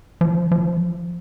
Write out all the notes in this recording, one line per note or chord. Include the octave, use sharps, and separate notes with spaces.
F3
F3